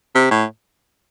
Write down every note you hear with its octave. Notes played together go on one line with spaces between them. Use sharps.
C3
A2